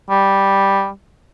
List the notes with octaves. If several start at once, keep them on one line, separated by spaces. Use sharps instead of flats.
G3